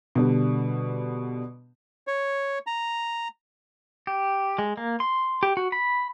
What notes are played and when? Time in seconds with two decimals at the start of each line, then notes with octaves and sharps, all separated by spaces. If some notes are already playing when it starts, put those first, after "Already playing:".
0.15 B2 D3 G3
2.07 C#5
2.67 A#5
4.07 G4
4.59 G#3
4.77 A#3
5.00 C6
5.43 G4
5.57 F#4
5.72 B5